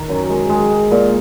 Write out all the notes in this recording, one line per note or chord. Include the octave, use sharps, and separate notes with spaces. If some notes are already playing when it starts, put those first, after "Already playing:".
Already playing: D#3
F#2
G#3
G#3
G#3
A#2